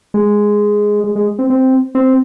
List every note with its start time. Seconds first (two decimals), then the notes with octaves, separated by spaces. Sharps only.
0.14 G#3
1.04 G#3
1.15 G#3
1.39 C4
1.50 C4
1.95 C4